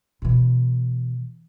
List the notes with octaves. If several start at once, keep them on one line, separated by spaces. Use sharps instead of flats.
B2 E3